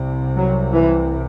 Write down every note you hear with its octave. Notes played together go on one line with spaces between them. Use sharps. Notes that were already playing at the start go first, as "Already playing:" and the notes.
Already playing: C2 C3
F#3
E3